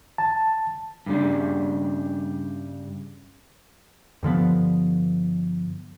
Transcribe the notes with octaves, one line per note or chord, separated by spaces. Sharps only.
A5
G2 C#3 G3
G2 D3 F3 B3